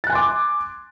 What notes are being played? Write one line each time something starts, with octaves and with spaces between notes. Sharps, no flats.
G#5 C6 D6 F#6 A6